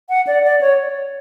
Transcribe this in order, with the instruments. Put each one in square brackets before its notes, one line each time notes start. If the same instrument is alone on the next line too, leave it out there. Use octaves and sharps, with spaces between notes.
[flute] F#5
D5
D5
C#5